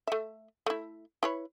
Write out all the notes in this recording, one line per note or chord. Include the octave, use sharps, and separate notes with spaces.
A3 E5
A3 E4
E4 B4 C#5